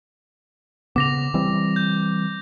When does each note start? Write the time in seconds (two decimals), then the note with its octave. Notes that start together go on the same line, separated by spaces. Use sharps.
0.96 C#3 B3 D6 A#6 F7
1.34 E3 G3 C4
1.76 G6